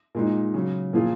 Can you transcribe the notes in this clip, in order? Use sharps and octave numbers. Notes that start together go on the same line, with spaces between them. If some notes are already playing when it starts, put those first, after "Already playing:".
A#2 G#3 D#4
C#3 F#3 C#4
A#2 F3 A#3 F4 G#4